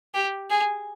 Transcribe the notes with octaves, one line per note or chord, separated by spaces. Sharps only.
G4
G#4